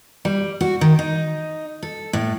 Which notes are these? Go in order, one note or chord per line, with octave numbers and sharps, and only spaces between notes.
G3
F#4
D#3
D#4
A4
A2